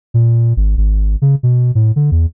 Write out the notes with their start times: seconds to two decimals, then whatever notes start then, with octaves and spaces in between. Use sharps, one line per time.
0.14 A#2
0.57 G#1
0.77 G#1
1.22 C#3
1.43 B2
1.75 A2
1.96 D3
2.11 E2